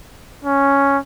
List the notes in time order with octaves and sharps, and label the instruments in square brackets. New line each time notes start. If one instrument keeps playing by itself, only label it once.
[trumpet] C#4